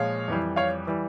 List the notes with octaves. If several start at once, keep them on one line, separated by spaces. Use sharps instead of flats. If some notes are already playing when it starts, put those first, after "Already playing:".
Already playing: A#2 F3 G#3 C#5 F5
F2 E3 G3
C#5 F5
E3 G3